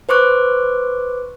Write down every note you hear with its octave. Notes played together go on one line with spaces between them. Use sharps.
B4 C5 C#6 D6 F#6